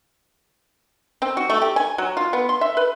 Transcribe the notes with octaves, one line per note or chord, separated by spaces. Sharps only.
C4
F#4
A3
G4
G#5
F#3
F4
B3
C6
E5
B4